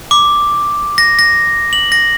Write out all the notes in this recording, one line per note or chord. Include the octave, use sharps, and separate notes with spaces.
D6
A#6
A#6
F#7
A#6